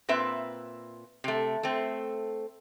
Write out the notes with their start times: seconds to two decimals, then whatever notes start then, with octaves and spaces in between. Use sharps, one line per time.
0.09 A#2 C4 B4 E5
1.24 C3 A3
1.63 A3 C4